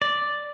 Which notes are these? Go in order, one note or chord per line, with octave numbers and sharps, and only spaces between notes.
D5